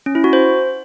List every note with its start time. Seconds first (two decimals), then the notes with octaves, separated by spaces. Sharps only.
0.06 C#4
0.15 E4
0.24 F#4
0.33 C5